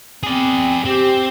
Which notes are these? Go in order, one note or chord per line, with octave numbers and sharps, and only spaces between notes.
C4 G#4 D5
C4 G4